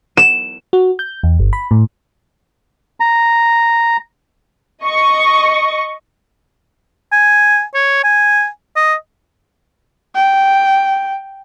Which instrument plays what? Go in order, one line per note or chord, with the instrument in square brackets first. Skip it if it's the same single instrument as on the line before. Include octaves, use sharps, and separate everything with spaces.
[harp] E7
[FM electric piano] F#4
G6
E2
G1
B5
A2
[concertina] A#5
[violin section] D#5 C#6
[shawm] G#5
C#5
G#5
D#5
[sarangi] G5